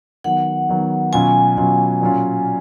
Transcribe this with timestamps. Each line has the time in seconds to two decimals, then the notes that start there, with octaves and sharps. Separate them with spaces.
0.24 D#3 F#3 B3 F#5
0.69 D#3 F#3 B3
1.13 B2 F#3 C#4 F4 G#5
1.57 B2 F#3 C#4 F4
2.01 A#2 F#3 C#4 F4